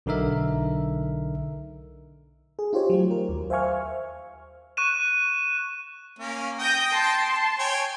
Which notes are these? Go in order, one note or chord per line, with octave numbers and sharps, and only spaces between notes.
B1 D3 D#4 A#4 E5
G#4
D#4 F4 G4 C5 C#5
F#3 A3
A#4
D#2
C5 E5 F5 G#5 C#6 F6
C#6 F#6 D#7 E7
A#3 C#4
G5 D#6 G6 A#6
A5 C6
C#5 G5 G#5